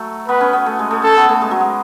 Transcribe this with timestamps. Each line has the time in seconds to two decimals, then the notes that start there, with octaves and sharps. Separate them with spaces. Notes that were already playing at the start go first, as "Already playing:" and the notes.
Already playing: F#3 A3
0.28 B3 B4
0.41 C#4
0.53 B3
0.66 A3
0.79 G#3
0.91 A3
1.03 C#4 A4
1.17 B3
1.29 A3
1.42 G#3
1.51 F#3
1.60 G#3